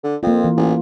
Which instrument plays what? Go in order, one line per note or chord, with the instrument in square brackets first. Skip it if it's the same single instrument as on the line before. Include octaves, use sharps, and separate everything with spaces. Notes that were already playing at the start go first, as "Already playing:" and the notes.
[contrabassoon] D3
[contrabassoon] F2 [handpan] A#3 F4
[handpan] E3
[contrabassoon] A1